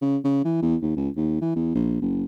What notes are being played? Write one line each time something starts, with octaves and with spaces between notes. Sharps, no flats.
C#3
C#3
E3
E2
D#2
C#2
D#2
E3
E2
A#1
F#1